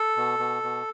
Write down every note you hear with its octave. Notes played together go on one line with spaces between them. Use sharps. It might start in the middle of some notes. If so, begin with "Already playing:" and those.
Already playing: A4
B2
B2
B2